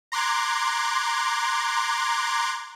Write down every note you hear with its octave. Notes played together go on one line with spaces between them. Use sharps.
A#5 C6 D6 F#6 G#6